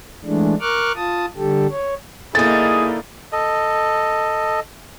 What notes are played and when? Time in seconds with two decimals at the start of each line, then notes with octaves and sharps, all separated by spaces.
0.25 E3 G#3 A3 D4
0.61 A#4 C#6 D6 F6 F#6
0.96 F4 A5 D#6
1.37 D3 G3 G4 A4
1.70 C#5
2.35 D3 A#3 D#4 E4 G#4 A6
3.33 A4 D#5